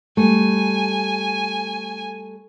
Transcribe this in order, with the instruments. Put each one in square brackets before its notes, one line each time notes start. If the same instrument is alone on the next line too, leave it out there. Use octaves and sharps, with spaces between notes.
[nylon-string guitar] G3 A3 [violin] G#5